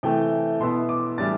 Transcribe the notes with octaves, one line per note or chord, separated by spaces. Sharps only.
C3 E3 A3 G5
B2 B3 E4 C6
D6
A2 E3 G3 D4 A6